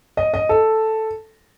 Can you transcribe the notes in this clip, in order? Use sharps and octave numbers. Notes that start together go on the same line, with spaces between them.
D#5
D#5
A4